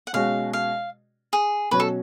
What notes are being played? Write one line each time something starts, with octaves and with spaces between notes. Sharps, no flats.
F#5
B2 G#3 C#4 F#4 F5
F5
G#4
B2 F#3 C#4 F#4 B4
A4